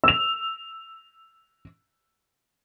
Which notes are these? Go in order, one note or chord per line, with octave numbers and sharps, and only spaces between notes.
E6 F7